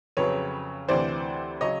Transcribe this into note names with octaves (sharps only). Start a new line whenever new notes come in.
F2 C#3 F#3 B4 C#5
D2 C3 E3 C5 D5
C#3 F#3 C#5 D#5